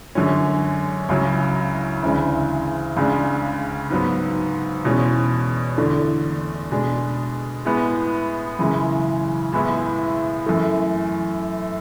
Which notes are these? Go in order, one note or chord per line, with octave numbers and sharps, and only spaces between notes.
F#2 D3 G#3 C#4
C#2 C#3 F#3 C#4 E4
D2 C#3 E3 G#3 D4
C#2 C#3 G#3 D4
G#2 F#3 B3
E2 B2 G#3 C#4
E2 D3 A3 D4
B2 G#3 D4
A2 G#3 B3
F#2 C#3 E3 G#3
A2 G#3 B3 E4
F#2 E3 A3